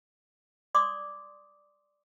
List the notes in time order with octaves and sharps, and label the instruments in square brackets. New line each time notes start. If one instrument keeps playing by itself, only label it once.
[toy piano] D5 C6 D6 D#6